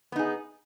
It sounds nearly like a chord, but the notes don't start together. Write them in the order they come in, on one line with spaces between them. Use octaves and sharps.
B3 D#4 G#4